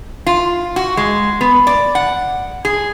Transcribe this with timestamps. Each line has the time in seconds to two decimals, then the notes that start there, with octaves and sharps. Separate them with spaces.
0.26 F4
0.76 F#4
0.97 G#3
1.41 B3
1.67 D5
1.95 F#5
2.65 G#4